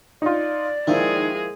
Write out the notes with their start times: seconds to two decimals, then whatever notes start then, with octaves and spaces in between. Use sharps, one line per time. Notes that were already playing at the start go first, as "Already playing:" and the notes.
0.22 D#4 F4 D5
0.87 D#3 F3 G#3 A#3 E4 G#4